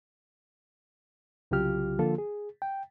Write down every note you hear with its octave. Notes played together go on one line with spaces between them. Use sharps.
C2 C#3 F#3 F4 G4 F6
D3 F3 A#3 F4 A4
G#4
G5